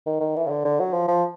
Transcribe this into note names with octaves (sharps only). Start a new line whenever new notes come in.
D#3
D#3
E3
C#3
D3
D3
F#3
F3
F3